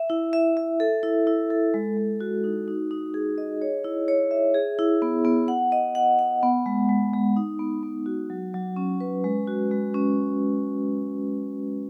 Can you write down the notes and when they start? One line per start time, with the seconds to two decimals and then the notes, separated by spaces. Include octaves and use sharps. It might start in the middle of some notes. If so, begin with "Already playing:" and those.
Already playing: E5
0.10 E4
0.33 E5
0.57 E5
0.80 A4
1.03 E4
1.27 E4
1.50 A4
1.74 G#3
1.97 G#3
2.21 F#4
2.44 D#4
2.68 D#4
2.91 D#4
3.14 G#4
3.38 D#5
3.62 C#5
3.84 E4
4.08 C#5
4.31 E5
4.54 G#4
4.79 E4
5.02 B3
5.25 B3
5.48 F#5
5.72 D#5
5.95 F#5
6.19 F#5
6.43 B3
6.66 G#3
6.89 G#3
7.13 G#3
7.37 D#4
7.59 B3
7.83 B3
8.06 F#4
8.30 F#3
8.54 F#3
8.76 C#4
9.00 B4
9.24 G#3
9.47 F#4
9.71 G#3
9.94 C#4